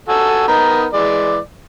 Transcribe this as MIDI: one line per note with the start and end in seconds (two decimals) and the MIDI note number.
0.09 0.45 66
0.09 0.45 69
0.09 0.45 80
0.48 0.86 59
0.48 0.86 63
0.48 0.86 70
0.93 1.38 52
0.93 1.38 56
0.93 1.38 74